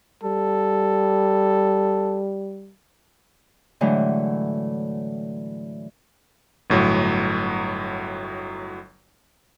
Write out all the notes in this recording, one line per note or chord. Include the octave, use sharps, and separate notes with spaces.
G3 A4
A2 D3 E3 F#3 G#3 A3
G1 A2 F#3